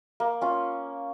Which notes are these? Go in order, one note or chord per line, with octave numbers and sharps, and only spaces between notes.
A#3
C#4 F4